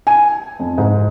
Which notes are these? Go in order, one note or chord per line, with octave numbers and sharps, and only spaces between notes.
G#5
F2
G#2